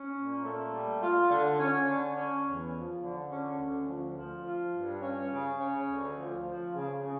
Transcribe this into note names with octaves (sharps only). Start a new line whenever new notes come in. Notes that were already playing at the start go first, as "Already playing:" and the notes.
Already playing: C#4
A#2
A3
G3
F4
D3
C#4
D3
C#4
E2
F3
D3
C#4
D2
F3
F3
F4
G2
C#4
C#3
C#4
D2
F3
F3
C#3
C#3